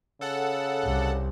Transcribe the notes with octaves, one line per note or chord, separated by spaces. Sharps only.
C#3 A4 F#5
C2